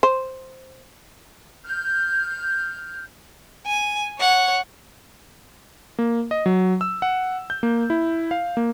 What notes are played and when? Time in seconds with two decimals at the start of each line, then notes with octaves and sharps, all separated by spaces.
0.03 C5
1.64 F6 G6
3.66 G#5
4.19 C#5 F#5
5.99 A#3
6.31 D#5
6.46 F#3
6.81 E6
7.02 F#5
7.50 G6
7.63 A#3
7.90 E4
8.31 F5
8.57 A#3